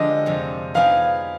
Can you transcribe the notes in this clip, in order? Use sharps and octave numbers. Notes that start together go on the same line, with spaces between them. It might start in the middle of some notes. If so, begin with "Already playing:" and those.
Already playing: D3 F3 G#3 D4 G4 D#5
F2 C3 F3
F3 B3 D#4 G#4 D5 F5